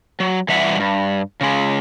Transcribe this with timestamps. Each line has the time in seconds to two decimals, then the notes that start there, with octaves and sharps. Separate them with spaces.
0.20 F#3
0.48 E3 G3 E5 F#5
0.80 G2
1.41 C#3 G#3